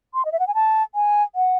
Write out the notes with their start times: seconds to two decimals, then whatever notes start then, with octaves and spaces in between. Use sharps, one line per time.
0.14 C6
0.25 D#5
0.32 E5
0.40 F#5
0.47 G#5
0.55 A5
0.95 G#5
1.35 F#5